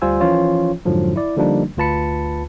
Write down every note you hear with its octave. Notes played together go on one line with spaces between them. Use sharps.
D2 G3 F4 C5 G#5 E6
E3 F3 C#4 F4 C#5
F2 G#2 D3 F3 F#3
E4 D5
D3 F3 G3 A#3 D4 D#4
D2 F4 B4 A5 B5 C#7